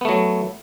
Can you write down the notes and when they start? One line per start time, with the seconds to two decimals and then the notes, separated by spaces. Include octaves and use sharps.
0.01 B3
0.05 A3
0.09 F#3